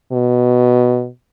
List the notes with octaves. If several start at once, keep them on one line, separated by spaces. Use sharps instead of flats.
B2